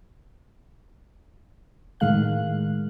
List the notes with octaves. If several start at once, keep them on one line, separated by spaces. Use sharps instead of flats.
A2 D#3 G#3 F5 F#6